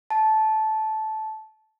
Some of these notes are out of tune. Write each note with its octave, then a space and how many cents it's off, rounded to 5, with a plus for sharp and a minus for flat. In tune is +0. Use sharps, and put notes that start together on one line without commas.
A5 -15